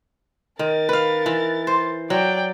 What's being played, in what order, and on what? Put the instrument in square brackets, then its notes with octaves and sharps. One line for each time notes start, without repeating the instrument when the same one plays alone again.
[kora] D#3 [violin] A#4 A6
[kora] B4 F5
E3
C5
[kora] F#3 [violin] D5 G5